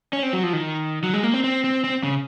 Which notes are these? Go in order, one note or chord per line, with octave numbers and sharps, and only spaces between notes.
C#4
C4
F#3
F3
D#3
F#3
G#3
A#3
C4
C4
C4
C4
C#3